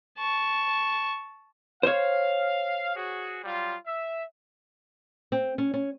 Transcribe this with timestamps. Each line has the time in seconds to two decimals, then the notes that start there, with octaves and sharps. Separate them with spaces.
0.19 A5 C#6
1.83 C5 C#5 F5
2.96 F#4 G#4
3.44 F#3 G3 F4
3.86 E5
5.32 C4
5.58 C#4
5.74 C#4